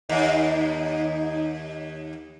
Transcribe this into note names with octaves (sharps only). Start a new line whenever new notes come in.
D#2 D#4